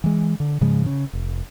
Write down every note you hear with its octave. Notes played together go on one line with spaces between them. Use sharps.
E3 G#3
D3
G#2 C#3 F3 G#3
C#3
F1